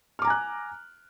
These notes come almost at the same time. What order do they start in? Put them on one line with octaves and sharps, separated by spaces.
F6 D6 A#5 G#5 F#6